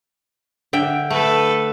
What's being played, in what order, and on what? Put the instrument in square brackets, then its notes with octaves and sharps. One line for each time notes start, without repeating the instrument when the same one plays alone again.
[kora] D3 E5 G5
[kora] A3 [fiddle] A4 B4